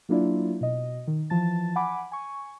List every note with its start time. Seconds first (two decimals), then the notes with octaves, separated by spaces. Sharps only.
0.09 F#3 A#3 D4 E4 F4 D5
0.61 B2 D#5
1.07 D#3
1.30 E3 F3 A5 A6
1.76 F#5 G#5 B5 D6
2.12 G#5 C#6